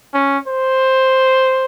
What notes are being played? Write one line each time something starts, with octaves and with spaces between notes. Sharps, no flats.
C#4
C5